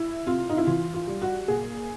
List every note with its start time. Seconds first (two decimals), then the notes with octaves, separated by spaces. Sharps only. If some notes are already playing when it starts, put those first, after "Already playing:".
Already playing: E4
0.26 C3 F4
0.49 D#4
0.57 E4
0.67 E3 F4
0.94 F4
1.07 G3
1.22 F#4
1.48 A#2 G#4